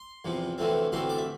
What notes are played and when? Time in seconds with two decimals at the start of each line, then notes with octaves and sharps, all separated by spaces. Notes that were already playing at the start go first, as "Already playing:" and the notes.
Already playing: C6
0.25 E2 C3 F3
0.58 D2 C3 E3 A3 C4
0.92 D2 C3 E3 A3 C4 C6
1.09 D5
1.18 E5